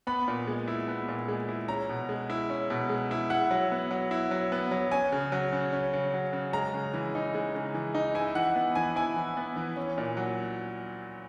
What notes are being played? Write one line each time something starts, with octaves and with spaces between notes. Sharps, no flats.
B3 B5
A#2
G#3
E4
B3
A#2
G#3
E4
C#4 A#5
B2
G#3
E4
C#4
B2
G#3
E4
E4 F#5
F#3
B3
F#3
E4
F#3
B3
F#3
C#4 G#5
C#3
F#3
C#3
C#4
C#3
F#3
C#3
G#3 A#5
C#3
E3
D#4
G#3
C#3
E3
D#4
E4 G#5
E3 F#5
B3
E3 G#5
E4 G#5
E3
B3
E3
C#4
A#2
F#3